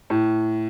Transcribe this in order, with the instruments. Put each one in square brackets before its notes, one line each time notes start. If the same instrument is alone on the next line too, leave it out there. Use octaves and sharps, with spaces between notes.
[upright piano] A2